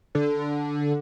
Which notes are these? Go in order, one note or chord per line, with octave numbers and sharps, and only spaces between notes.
D3